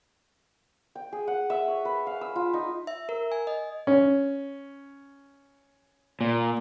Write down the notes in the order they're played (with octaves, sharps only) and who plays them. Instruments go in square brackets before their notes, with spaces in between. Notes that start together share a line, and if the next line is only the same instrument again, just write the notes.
[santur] G5
G#4
F#5
E5
C#5
B4
F5
E6
F4
D#4
[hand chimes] E5
A#4
G#5
D#5
[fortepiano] C#4
[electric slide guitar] A#2